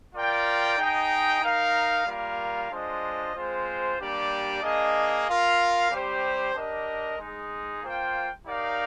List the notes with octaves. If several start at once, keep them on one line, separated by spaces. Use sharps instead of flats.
F4 A#4 D5 G5
D#4 G#4 D#5 G5
D#4 A#4 F5
G3 A#3 F4 A#4 F5
G#3 D4 F4 C5 D#5
G#3 C4 F4 C5
G3 A#3 D4 G4 D5
A#3 D4 G#4 D#5
F4 A#4 F5
G3 C4 G4 C5
D4 G4 A#4 D#5
G#3 D#4 G#4
A#3 F4 C5 G5
D#4 G4 A#4 D5 F5